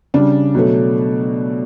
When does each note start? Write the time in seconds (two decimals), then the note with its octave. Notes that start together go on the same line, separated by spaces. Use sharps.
0.14 C#3 G3 D4
0.54 B2 F#3 A3